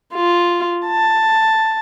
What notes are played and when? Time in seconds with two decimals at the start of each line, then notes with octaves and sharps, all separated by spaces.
0.14 F4
0.87 A5